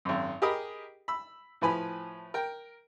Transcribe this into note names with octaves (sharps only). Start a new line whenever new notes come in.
G#1 F#2
G4 G#4 A#4 D#5 B5 D#6
B5 E6
A2 F3 B4 G#5 B5
A#4 G5